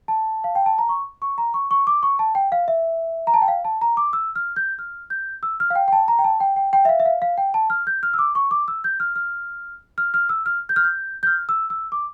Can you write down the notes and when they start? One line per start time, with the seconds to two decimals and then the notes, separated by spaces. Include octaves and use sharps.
0.08 A5
0.44 F5
0.55 G5
0.66 A5
0.78 A#5
0.89 C#6
1.22 C#6
1.38 A#5
1.54 C#6
1.71 C#6
1.87 D6
2.03 C#6
2.19 A5
2.35 G5
2.52 F5
2.68 E5
3.27 A#5
3.34 A5
3.42 G5
3.48 F5
3.65 A5
3.81 A#5
3.97 D6
4.13 E6
4.36 F6
4.56 G6
4.79 F6
5.10 G6
5.43 E6
5.60 F6
5.70 F5
5.75 G5
5.88 G5
5.92 A5
6.08 A#5
6.19 G5
6.24 A5
6.40 G5
6.56 G5
6.73 G5
6.85 E5
6.89 F5
7.00 E5
7.06 F5
7.22 F5
7.38 G5
7.54 A5
7.70 F6
7.87 G6
8.03 F6
8.14 E6
8.19 D6
8.35 C#6
8.51 D6
8.68 E6
8.84 G6
9.00 F6
9.16 F6
9.98 F6
10.14 F6
10.29 E6
10.46 F6
10.69 G6
10.76 F6
10.84 G6
11.23 G6
11.27 F6
11.49 E6
11.70 E6
11.92 D6